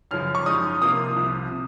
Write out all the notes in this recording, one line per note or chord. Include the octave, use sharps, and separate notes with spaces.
F#2 C#3 F3 F6
C#6
F#2 F3 G#3 D#4 D#6
C3 F3 A#3 F4 D#6
C2 C3 F3
C3